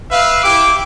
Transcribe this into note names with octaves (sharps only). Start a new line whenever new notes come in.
B4 E5 F5
E4 G4 D6